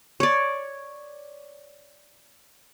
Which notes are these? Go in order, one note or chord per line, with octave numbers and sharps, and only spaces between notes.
C#5 D5